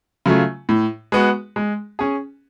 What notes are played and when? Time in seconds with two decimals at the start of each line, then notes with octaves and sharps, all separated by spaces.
0.26 C#3 F#3 A3 F4
0.69 A2
1.12 G#3 B3 F#4
1.56 G#3
1.99 C#4 G#4